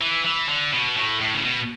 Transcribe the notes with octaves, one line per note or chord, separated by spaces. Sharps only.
E3
E3
D3
B2
A2
A2
C#3
B2